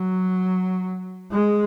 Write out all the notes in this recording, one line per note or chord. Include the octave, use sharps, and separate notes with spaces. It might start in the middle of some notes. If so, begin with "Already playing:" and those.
Already playing: F#3
G#3